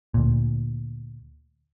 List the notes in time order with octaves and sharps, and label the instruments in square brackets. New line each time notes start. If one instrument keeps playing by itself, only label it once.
[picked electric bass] D2 A#2